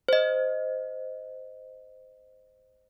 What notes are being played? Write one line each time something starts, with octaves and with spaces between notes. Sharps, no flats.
C5 D#5